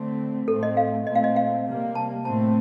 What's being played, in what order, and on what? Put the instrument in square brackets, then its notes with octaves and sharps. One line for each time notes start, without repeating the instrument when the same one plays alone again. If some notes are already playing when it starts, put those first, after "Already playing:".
Already playing: [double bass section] D3 A3 C4
[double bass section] A2 A3 C4 [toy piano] A4
[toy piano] D#5
F5
[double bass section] A#2 A3 C4 [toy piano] D#5
[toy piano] F5
D#5
F5
[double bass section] C3 G3 A#3
[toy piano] A5
[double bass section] A2 A3 C4 [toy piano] A5